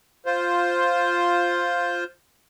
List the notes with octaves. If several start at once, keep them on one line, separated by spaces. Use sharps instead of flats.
F4 C5